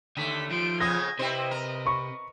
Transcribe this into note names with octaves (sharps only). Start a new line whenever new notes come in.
D#2 D3 A3 B6
F3 C6 D7
F2 C#3 B3 D#6 G#6 A#6
C3 C4 E4 B4 C5 D#5
A#4
B5 C#6